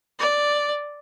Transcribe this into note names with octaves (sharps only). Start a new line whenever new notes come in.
D5